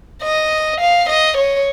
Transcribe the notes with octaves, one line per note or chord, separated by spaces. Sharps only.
D#5
F5
D#5
C#5